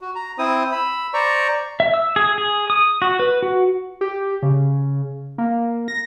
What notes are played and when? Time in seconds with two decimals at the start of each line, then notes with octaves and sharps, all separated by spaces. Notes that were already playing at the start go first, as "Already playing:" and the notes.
0.01 F#4
0.16 A#5
0.38 C4 E4 C5 D#6
0.72 B5 E6
1.14 C5 D5 A#5 C#6
1.80 E5
1.94 E6
2.16 G#4
2.38 G#4
2.70 D#6
3.02 F#4
3.19 B4
3.42 F#4
4.01 G4
4.43 C#3
5.38 A#3
5.88 A#6